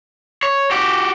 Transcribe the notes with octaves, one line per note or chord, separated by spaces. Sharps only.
C#5
F#4 G4